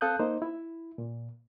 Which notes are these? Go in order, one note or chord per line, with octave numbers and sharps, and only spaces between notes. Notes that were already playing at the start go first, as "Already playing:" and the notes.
C4 A4 F5 D#6 F#6 G6
A#3 D#4 C5
E4
A#2